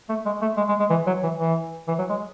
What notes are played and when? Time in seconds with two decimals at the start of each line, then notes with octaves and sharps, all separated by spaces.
0.09 A3
0.26 G#3
0.42 A3
0.57 G#3
0.69 G#3
0.80 G#3
0.90 E3
1.07 F#3
1.23 E3
1.39 E3
1.88 E3
1.99 F#3
2.10 G#3